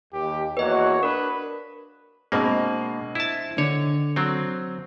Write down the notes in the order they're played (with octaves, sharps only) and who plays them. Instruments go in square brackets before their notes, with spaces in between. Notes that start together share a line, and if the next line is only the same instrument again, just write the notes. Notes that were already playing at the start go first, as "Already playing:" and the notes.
[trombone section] D#2 [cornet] G4
[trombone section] E2 A#3 F#4 [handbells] B4 D#5 [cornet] C#5
[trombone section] D4 [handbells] A#4 [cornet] B4
[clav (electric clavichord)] B2 A#3 [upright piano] G#3 C4 D4
[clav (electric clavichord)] E4 A5
[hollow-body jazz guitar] D3 [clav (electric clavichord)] C#5
[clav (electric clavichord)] F#3 C4